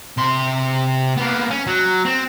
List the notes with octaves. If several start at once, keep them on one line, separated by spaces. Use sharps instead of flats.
C3 C6
A#3 B3
C#4
F#3
C4